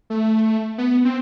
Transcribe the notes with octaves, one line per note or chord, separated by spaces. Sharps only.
A3
B3
C4